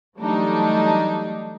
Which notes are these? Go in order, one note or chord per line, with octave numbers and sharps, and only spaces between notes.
E3 F#3 G3 A3 D4 D#4